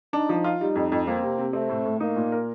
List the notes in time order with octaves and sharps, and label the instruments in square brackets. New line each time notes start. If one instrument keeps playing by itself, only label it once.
[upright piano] D4 [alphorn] D#4
[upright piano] F3
F4
[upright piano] G3 [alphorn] D#4
[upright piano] F2
F2
[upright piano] A#3 [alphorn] C4
[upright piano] C3
C3
[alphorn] A3 [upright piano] C4
[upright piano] A2
A2
[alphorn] A#3 [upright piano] D#4
[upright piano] A#2
A#4